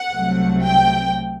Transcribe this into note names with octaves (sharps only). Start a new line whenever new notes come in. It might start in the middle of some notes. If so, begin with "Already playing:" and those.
Already playing: F#5
C2 C3 F#3 A3
G5